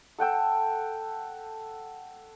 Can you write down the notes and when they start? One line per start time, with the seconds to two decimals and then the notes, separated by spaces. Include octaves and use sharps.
0.19 A4 F#5 G5 E6